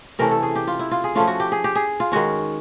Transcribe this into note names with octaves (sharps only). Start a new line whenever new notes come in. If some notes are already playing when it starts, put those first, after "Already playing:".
C3 E3 A3 C#4 A#4
A4
G#4
G4
F4
E4
F4
G#4
F3 A3 C#4 F4
F#4
G4
G#4
G4
G#4
F4
D#3 G#3 C#4 F#4